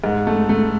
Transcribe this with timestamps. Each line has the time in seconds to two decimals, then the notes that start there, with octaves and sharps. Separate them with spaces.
0.04 G#2
0.27 A3
0.49 A3